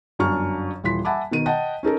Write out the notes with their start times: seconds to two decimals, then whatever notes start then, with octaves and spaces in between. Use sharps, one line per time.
0.19 G1 F#2 D4 C#6 F6
0.84 D#1 E3 C6 B6
1.05 E5 F#5 G#5 A5 B5 D6
1.31 B2 D#3 D#7
1.46 D#5 F#5 G5 A5
1.83 C#4 D#4 A4 A#4